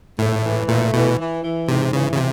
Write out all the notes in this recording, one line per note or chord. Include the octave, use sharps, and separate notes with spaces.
A2 A3
E3
A#2 A3
B2 E3
E3
E3
G#2 C3
C#3 E3
C#3
C3